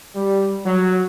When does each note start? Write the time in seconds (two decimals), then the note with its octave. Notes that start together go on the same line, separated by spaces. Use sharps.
0.15 G3
0.65 F#3